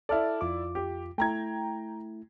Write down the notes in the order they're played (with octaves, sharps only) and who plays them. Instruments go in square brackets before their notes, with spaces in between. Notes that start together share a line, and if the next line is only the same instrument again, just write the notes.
[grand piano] E4 D5 [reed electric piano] A4 A5 F6
[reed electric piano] F2 F4 D6
[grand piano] G4
[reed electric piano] A3 E4 [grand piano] G5 A#5 G#6